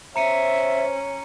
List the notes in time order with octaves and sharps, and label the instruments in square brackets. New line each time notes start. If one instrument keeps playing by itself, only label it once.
[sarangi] C#4 [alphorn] C5 [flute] E5 [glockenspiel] A#5 C#7 D#7